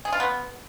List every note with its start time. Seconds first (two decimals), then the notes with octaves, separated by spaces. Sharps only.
0.05 G#4
0.12 F4
0.20 B3